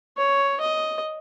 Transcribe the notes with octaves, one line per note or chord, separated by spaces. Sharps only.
C#5
D#5